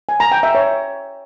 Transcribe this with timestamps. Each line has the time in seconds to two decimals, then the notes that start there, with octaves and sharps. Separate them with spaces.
0.09 G#5
0.20 A#5
0.32 G5
0.43 E5
0.55 C#5